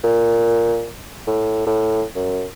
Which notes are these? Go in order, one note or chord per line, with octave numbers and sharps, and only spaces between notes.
A#2
A2
A2
F#2